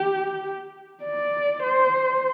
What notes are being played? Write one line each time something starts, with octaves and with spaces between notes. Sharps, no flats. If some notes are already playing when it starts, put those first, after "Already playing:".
Already playing: G4
D5
C5